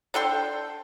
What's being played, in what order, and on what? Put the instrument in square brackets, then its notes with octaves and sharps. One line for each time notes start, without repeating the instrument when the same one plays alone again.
[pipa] D4 A4 G5 C6